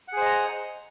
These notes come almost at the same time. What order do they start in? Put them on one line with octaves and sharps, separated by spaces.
F#5 G#4 C5 D#5 A#5